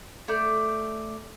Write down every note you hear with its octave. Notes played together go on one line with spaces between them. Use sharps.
A3 D5 G6